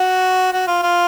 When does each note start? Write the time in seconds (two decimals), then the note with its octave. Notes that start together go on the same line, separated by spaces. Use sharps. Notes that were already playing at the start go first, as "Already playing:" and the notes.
Already playing: F#4
0.53 F#4
0.67 F4
0.83 F4